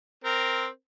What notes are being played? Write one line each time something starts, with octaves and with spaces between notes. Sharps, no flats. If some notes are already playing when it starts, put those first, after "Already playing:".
C4 A#4